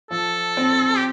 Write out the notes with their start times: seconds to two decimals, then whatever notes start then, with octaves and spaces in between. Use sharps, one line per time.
0.11 F3 A4
0.57 C4
0.96 G4